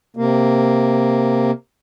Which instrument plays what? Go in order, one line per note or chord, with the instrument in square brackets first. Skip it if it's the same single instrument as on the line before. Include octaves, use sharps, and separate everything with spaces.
[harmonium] C3 A#3